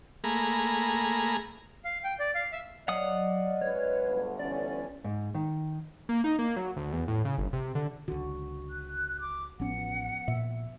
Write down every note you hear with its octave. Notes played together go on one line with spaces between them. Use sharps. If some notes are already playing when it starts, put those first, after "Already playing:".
A3 A#3 G#4 A#5 B5
F5
G5
D5
F5
E5
F#3 D5 D#5 F5 F#5 D#6
F#2 G#3 B4 C#5
G1 D2
D3 E3 C#4 D5
G#2
D#3
A#3
D#4
A#3
F#3
D2
E2
A2
C#3
G1
C3
D3
C#2 D3 F#4
F#6
D6
A1 F3 B3 C#4 F#5
A#2 E5